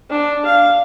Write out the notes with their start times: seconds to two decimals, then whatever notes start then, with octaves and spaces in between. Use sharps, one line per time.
0.10 D4
0.46 F5